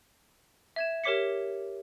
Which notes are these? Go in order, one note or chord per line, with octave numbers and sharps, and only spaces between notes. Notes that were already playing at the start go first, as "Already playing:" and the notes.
E5 G#6 E7
G4 A#4 C#5 D6 B6 C#7